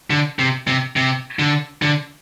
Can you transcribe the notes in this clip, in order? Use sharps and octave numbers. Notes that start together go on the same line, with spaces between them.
D3
C3
C3
C3
D3
D3